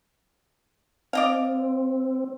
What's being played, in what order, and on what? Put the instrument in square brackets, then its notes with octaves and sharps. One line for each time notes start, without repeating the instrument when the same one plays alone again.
[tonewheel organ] C4 [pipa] D5 D#5 F5